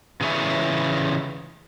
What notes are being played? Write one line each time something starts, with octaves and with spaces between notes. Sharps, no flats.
C#3 E3 G#4 C#5 E5